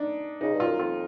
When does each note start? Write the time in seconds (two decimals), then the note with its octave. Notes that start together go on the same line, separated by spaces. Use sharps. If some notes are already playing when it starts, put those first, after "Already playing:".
Already playing: D4 D#4
0.41 C#3 D#4
0.53 G2
0.60 F4
0.67 F#2
0.79 F2 F4